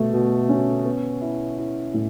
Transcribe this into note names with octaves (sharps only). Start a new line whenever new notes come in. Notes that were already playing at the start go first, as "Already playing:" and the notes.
Already playing: B2 A3
B2
C#4
B3
E4
E4
A2